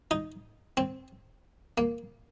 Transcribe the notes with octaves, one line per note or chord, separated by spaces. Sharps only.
D#4
C4
A#3